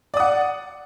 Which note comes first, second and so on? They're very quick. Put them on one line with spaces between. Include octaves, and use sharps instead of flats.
D5 D#6 F#5